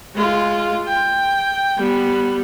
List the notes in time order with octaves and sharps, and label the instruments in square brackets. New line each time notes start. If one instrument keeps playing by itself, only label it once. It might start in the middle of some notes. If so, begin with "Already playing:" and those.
[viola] G#3 F4
G5
G3 B3